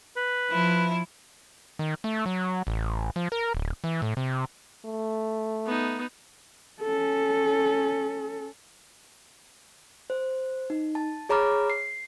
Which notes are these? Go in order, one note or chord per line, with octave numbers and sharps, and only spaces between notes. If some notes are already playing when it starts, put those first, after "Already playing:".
B4
F3 E4
D#3
A3
F#3
A1
F3
A#4
D1
E3
A2
C3
A3
B3 D#4
C#4 A4
C5
D#4
A5
G#4 C#5 A#5 B5 D6 F6
C7